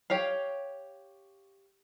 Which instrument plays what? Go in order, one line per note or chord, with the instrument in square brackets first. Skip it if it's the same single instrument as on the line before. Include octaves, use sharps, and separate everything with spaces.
[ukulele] G4 C#5 F5